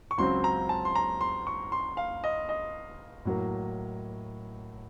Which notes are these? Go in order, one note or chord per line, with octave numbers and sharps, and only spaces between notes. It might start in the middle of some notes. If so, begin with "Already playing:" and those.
C#6
C#2 C#3 F#3 C4 C6
A#5
A5
C6
A#5
C6
C#6
C6
F5
D#5
D#5
A2 F#3 A#3